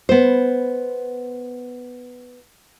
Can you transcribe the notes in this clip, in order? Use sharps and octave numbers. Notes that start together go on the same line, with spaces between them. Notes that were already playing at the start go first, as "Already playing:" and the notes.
B3 C5